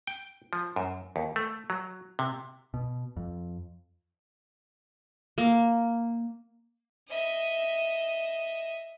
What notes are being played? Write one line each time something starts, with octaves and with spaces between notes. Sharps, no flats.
G5
F3
F#2
D#2
A3
F#3
C3
B2
F2
A#3
D#5 E5